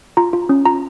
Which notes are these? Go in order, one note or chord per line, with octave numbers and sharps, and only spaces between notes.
F4 A#5
F4
C#4
F4 A#5